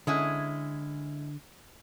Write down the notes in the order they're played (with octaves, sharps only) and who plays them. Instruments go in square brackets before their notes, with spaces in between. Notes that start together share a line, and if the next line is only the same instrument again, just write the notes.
[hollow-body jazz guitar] D3 [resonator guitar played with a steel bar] G#3 C#4 E4